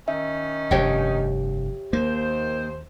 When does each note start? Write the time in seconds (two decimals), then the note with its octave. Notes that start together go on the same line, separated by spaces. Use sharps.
0.08 D#3 C#4 D#4 E5
0.71 F1 G2 G4 C#5 G5
1.93 D#2 A#3 C5